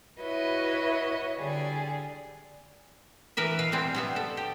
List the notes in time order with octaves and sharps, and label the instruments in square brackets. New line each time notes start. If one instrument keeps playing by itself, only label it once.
[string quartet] E4 F#4 B4 C#5 D#5 E5
D3 G3 G#4
[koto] E3 A#4 B4 E5
B2 B4 F5
G3 G#3 C4 G#4
G3 B3 E5
A4
G4